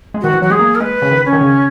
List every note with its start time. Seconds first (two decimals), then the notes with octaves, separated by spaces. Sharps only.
0.14 G#3
0.22 D#3 F#4
0.34 E3
0.42 F#3 F#4
0.50 G#3 G#4
0.59 A#3
0.75 A#4
0.80 G#3 B4
1.02 C#3
1.11 D#3
1.25 C#4
1.33 D#3
1.41 C#3